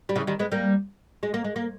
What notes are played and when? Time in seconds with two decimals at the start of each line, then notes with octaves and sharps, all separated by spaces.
0.09 G3
0.16 C#3 E3
0.27 D#3 G3
0.39 G#3 B3
0.52 G3 A#3
1.23 G#3
1.34 A#3
1.44 G#3
1.56 A#3